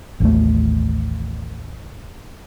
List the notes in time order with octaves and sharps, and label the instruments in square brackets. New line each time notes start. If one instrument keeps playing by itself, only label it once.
[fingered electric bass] A1 D#2 A3